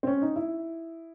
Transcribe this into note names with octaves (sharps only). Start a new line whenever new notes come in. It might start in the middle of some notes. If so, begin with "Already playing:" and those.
C4
C#4
D#4
E4